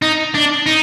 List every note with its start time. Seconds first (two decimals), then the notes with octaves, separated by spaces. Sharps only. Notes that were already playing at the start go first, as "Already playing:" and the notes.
0.02 D#4
0.35 D4
0.66 D#4